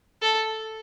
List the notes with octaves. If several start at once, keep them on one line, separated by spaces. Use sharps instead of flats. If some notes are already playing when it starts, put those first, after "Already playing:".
A4